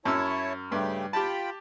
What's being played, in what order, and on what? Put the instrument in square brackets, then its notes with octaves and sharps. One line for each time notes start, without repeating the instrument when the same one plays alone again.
[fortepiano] F#2 E6 [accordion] E4 C#5 A5
[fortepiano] G2 [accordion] C#3 A3 G4
[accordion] F4 G5 B5 [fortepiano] G4 A5